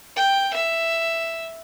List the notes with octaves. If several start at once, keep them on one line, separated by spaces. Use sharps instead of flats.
G5
E5